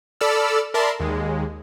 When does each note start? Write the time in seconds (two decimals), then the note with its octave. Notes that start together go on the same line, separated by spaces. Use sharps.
0.21 A4 D5 B5 E6 F6
0.74 A#4 D5 E5 A5 B5 C6
1.00 D#2 G#3